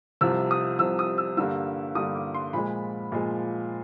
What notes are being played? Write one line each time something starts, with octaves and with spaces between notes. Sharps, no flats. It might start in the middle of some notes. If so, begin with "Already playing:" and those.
C2 C3 F3 E6
D#6
C2 C3 F3 E6
D#6
E6
G2 D3 G3 A#3 E6
G2 D3 G3 A#3 D#6
D6
C6
A#2 F3 G#3 B5
A#2 F3 G#3